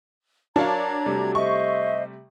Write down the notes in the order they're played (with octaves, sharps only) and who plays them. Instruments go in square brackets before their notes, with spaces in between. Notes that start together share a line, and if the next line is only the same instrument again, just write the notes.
[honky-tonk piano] F#3 D4 A5 [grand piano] A#4 C#5 F5 [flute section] A#5 G#6
[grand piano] C3 G3 A3
[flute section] C5 D#5 E5 [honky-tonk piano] C#6